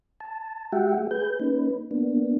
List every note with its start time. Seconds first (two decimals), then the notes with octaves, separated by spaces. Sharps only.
0.21 A5
0.72 G#3 F#4 G4 E5 F#5 G5
0.98 A3 G#4
1.11 G#4 B4 G6
1.40 A#3 C#4 D#4 B4
1.91 A#3 B3 D4